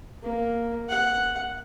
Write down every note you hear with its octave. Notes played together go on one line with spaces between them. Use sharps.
A#3
F#5